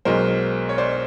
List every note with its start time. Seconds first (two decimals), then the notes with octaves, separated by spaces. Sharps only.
0.05 B1 B2 G#3 A#4 C5
0.69 C#5
0.78 C5 D5